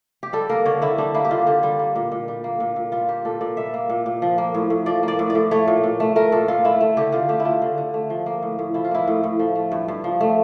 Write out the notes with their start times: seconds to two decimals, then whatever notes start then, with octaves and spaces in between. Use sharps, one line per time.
0.23 G4
0.33 G3 A4
0.49 A#3 A#4
0.65 D3 C#5
0.82 D3 E4
0.98 G3 D4
1.14 A#3 E4
1.25 G4
1.31 D3 F4
1.47 D3 G4
1.63 G3
1.79 A#3
1.96 A#2
2.12 A#2
2.28 G3
2.44 A#3
2.60 A#2
2.76 A#2
2.92 G3 F4
3.08 A#3 G4
3.25 A#2 A4
3.41 A#2 D5
3.57 G3 E5
3.74 A#3
3.90 A#2
4.06 A#2
4.22 F3
4.38 A#3
4.55 A2
4.70 A2
4.86 F3 D5
5.03 A#3 D5
5.19 A2
5.30 D5
5.35 A2
5.51 A3 C#5
5.67 A#2
5.84 A#2
6.00 A3
6.16 A3 A#4
6.32 A#2 A4
6.48 A#2 F4
6.64 A3 E4
6.80 A3
6.97 D3 G4
7.12 D3 F4
7.29 A3 G4
7.40 E4
7.45 A3 F4
7.62 D3
7.78 D3
7.94 A3
8.10 F3
8.26 A#3
8.43 A2
8.59 A2
8.74 F3 E4
8.84 F4
8.91 A#3 E4
9.08 A2
9.23 A2
9.39 F3
9.56 A3
9.72 G2
9.88 G2
10.04 F3
10.20 A3